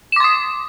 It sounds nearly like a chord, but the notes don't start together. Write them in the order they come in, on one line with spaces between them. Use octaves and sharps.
E7 D6 C6 D#6